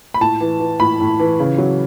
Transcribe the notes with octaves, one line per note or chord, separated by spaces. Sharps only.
B5
A2 A5
E3
E3
A2 B5
A2
E3
C#3
F#3